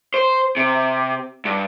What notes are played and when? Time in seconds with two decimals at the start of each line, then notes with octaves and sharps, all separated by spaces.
0.14 C5
0.57 C3
1.45 G2